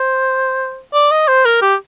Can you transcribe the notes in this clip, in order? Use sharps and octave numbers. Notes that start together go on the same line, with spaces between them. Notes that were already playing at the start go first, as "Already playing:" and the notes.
Already playing: C5
D5
D#5
C5
A#4
G4